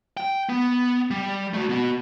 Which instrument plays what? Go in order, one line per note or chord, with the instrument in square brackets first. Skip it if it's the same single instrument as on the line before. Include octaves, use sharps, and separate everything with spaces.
[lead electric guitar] G5
B3
G3
A3 F#4
B3 F#4